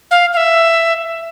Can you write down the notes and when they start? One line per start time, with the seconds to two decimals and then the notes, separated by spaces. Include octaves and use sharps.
0.11 F5
0.33 F5
0.37 E5